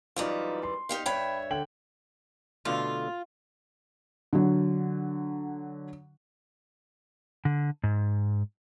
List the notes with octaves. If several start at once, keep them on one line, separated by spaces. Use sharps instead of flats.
F#2 E3 G3 D#4 F4
C6
D#4 G4 F5
G2 C#5 E5 G5 B5
D3 G5 F#7
B2 D3 A3 F4
D3 F#3
D3
G#2